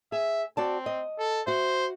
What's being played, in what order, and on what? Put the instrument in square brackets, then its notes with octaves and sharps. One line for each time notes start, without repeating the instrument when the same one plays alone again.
[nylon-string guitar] G#4 [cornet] E5
[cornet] C4 [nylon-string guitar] F#4 D5 A5
[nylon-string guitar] D#5
[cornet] A4
[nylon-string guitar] F#4 E5 [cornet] C5